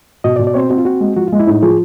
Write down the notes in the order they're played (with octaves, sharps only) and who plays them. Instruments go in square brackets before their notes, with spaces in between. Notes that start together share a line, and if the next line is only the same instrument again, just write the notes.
[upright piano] B2 [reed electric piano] D#5
[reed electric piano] D5
[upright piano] B2
[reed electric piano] D5
[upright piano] C4 [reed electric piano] C5 C#5
[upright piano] C4 [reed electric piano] F#4
[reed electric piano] F4
[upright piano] C4 [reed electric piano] F#4
[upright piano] G#3
[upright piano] F3 [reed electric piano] F#4
[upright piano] G#3 [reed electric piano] F4
[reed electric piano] E4
[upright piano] A2 [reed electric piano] D#4
[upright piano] F3 [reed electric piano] G#4